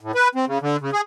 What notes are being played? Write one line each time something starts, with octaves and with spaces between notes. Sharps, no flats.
A2
B4
C4
C#3
D3
C#3
G#4